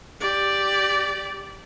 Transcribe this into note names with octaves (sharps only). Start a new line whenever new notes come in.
G4 D5